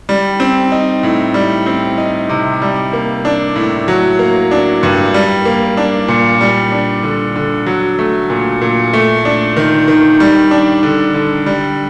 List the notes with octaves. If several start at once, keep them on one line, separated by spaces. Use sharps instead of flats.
G3
C4
D#4
A2
G3
C4
D#4
C3
G3
A#3
D4
A2
F#3
A#3
D4
G2
G3
A#3
D4
A#2
G3
D4
D3
D3
F#3
A3
A#2
A#2
A3
D4
D#3
D#3
G3
D4
D3
D3
G3